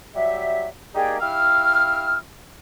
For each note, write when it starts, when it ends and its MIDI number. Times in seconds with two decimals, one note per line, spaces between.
0.15 0.67 54
0.15 0.67 55
0.15 0.67 67
0.15 0.67 76
0.95 1.17 58
0.95 1.17 63
0.95 1.17 67
0.95 1.17 68
0.95 1.17 74
0.95 1.17 79
1.21 2.17 64
1.21 2.17 67
1.21 2.17 77
1.21 2.17 88
1.21 2.17 89